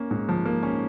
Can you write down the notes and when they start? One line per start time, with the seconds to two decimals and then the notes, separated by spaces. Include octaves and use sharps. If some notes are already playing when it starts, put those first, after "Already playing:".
Already playing: A#3 C#4
0.11 G#2
0.29 F3
0.45 A#3
0.63 C#4